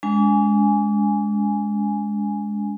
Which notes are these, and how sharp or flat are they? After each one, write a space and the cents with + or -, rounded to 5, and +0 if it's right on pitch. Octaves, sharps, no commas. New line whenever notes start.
G#3 +0 D4 -40 G#5 +0